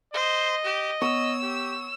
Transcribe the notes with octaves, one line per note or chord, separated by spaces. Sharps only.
C5 D#5
G4
B3 C#5 E6
G4